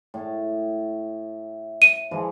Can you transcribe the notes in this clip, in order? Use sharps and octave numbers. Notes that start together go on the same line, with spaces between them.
A2
D#7
E3 F3 G#3